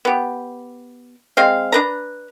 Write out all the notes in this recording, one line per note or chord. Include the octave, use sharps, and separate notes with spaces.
B3 G4
G#3 C4 F5
D4 B4 A#5